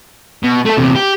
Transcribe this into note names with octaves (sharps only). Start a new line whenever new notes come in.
B2
A3 A4
E2 C3
G4